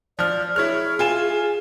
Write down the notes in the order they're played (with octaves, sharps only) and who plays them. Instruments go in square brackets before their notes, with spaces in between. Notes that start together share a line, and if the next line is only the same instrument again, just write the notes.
[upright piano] F3 F6 [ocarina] D5
[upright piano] E4 C#5 F6 [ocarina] G#4
[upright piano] F4 G#5 E7